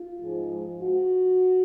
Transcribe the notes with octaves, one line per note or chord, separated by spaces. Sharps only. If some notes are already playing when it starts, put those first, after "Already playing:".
Already playing: F4
G#2 F3 G#3
F#4